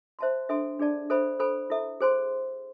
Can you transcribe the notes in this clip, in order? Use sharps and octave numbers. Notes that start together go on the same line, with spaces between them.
C5 E5 A5 C6
D4 A4 E5 G#5 C6
D4 G#4 D5 A5
A4 C5 E5 G#5 B5
A4 C5 G#5 B5
E4 A4 E5
G#4 C5 G#5 C6